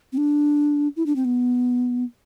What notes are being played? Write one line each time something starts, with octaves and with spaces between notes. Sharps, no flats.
C4
D4
E4
D4
C4
B3